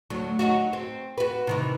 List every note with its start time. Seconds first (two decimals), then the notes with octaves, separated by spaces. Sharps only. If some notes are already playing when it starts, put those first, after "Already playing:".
0.10 D2 F#3
0.39 F#3 D#4 F#4
0.73 C4
1.18 F#4 B4
1.47 C3 D#3 E3